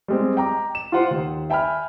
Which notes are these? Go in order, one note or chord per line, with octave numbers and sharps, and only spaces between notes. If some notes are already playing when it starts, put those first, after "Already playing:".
G3 G#3 C4
G5 A#5 D6
E7
F4 G4 C5 F#5 C6
D#2
E5 G5 G#5 B5 F6